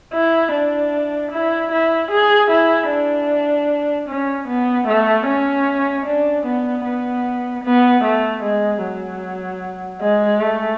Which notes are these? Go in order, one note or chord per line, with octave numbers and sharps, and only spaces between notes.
E4
D4
E4
E4
G#4
E4
D4
C#4
B3
A3
C#4
D4
B3
B3
B3
A3
G#3
F#3
G#3
A3